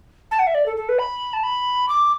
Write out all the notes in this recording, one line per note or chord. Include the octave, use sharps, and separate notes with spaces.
A5
F#5
E5
D5
A4
A4
B4
B5
A5
B5
D6